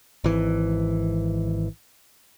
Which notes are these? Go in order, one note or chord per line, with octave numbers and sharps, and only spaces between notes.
G#1 E3